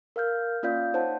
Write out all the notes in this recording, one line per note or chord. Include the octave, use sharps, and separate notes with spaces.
A#4 F5 F6 G6
A#3 C#4 F4 D5 F5 G6
D#4 C5 C#5 F#5 A5